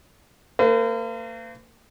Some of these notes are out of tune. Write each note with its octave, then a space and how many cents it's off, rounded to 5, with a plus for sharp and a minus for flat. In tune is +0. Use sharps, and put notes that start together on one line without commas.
A#3 -35 B4 +45